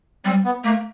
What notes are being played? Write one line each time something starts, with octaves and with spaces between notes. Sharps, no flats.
G3 C4
B3
A3 A#3